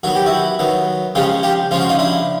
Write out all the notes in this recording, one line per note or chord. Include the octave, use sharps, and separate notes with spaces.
D#3 F#3 B3 F#4
G4
E4 F#4
D#3 F#3 B3
C#3 F3 G#3 C#4 F4 G4
F4 G4
C#3 F3 G#3 C#4 F4
F#4
D#4 F4
D4 E4